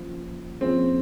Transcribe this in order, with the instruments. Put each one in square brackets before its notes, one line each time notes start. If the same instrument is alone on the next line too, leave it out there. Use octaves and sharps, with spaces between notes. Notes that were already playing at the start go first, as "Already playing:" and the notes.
Already playing: [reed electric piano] F3 A#3 C#4 F4 C5
[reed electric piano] F3 A#3 C#4 F4 G#4 [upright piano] C4